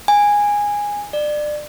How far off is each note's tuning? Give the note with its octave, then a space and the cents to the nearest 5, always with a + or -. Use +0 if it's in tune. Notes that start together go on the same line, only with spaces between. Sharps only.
G#5 -10
D5 +25